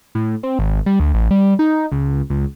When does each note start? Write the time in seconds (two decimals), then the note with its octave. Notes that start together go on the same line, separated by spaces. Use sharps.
0.15 A2
0.43 C4
0.59 G#1
0.86 G3
1.00 D2
1.14 A1
1.31 G3
1.59 D#4
1.92 C#2
2.30 C#2